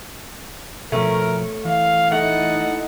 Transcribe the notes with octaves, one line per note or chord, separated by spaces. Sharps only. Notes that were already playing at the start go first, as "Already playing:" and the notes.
B2 F3 A3 C#4 A#4
E3 F5
A3 D#4 E4 F#5